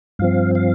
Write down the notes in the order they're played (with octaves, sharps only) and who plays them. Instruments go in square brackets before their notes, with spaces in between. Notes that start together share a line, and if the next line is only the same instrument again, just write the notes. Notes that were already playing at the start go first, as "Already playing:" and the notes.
[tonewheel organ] G2 F3 C4 F5
F5